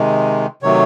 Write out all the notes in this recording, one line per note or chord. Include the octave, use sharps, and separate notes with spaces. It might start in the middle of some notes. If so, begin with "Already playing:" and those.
Already playing: C3 D#3 G#3
C3 D#3 F#3 A3 C#5